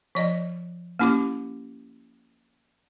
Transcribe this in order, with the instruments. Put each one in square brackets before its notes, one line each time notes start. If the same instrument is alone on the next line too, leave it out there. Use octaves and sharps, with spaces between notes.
[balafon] F3 D5 D#5
A#3 C#4 E4 G4 D6